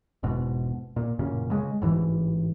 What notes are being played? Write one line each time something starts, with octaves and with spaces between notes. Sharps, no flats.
E1 G#2 B2
A#2
A1 F#2 A#2 C#3
C#3 G#3
A1 G#2 E3